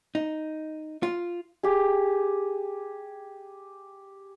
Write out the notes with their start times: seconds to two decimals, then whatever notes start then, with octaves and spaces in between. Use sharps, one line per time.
0.15 D#4
1.03 F4
1.63 G4 G#4